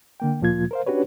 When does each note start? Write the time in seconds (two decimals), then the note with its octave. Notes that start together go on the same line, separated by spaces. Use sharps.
0.20 D3 A#3 G5
0.41 D2 A#2 F3 A#3 F4 G#6
0.71 A#4 C5 F5
0.86 C#4 D4 F#4 G4 B4 C#5